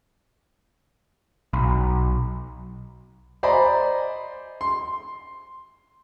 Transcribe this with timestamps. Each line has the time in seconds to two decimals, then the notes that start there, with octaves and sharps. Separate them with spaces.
1.53 B1
3.43 C5 D5 D#5 G#5 A#5 B5
4.61 C6